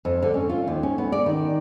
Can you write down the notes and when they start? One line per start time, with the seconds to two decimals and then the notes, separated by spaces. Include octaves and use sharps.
0.05 F2
0.22 D3
0.34 C#4
0.49 F4
0.67 D#2
0.83 C#4
0.98 B3
1.12 D5
1.26 D#3